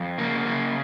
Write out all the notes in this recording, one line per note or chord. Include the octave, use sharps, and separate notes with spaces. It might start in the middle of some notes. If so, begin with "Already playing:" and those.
Already playing: F2
C#3 A#3
C#3